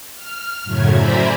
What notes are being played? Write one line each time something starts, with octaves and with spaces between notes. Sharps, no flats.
F6
F#2 A2 C#3 F#3 A3 G#6
C5 D5 E5 G#5 A#5 B5